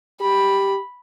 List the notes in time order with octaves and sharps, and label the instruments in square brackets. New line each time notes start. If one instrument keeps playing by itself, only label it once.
[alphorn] G4 [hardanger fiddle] B5